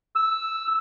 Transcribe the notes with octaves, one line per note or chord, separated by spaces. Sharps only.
E6